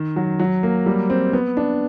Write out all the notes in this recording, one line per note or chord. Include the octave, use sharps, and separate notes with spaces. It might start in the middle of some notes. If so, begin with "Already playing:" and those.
Already playing: D#3
F#3
F#3
A#3
G3
C4
B3
D4